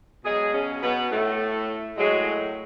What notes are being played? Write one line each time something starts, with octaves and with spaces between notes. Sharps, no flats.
B2 F#3 G#3 G#4
C#3 C#4
B2 B3
A2 A3
A2 F#3 G#3